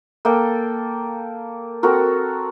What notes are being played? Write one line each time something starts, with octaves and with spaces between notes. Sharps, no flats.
A#3 A4 G5
C4 F#4 A4 A#4